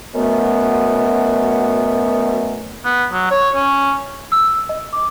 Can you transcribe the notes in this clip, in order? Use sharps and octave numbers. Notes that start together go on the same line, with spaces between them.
F#2 B2 A3 B3
B3
F#3
C#5
C#4
E6
D#5
D6